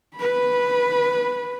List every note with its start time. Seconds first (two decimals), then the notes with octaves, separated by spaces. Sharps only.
0.16 B4 B5